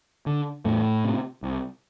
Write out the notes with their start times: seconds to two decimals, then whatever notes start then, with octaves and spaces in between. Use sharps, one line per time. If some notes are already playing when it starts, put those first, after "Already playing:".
0.26 D3
0.65 E2 A2 A3
1.04 C3
1.43 C2